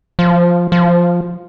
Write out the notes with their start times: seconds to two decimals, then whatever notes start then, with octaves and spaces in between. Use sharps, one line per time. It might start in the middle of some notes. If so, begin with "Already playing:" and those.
0.19 F3
0.72 F3